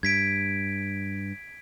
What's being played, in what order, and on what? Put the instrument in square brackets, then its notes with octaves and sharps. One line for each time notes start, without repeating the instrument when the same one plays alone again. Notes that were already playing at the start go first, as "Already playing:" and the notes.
[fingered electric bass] G2 [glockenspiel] G#6 B6 D7